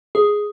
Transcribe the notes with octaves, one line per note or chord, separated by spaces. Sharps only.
G#4